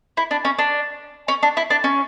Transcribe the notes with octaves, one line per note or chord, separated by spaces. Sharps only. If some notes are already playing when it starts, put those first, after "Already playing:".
E4
D4
C#4
D4
C#4
D4
E4
D4
C#4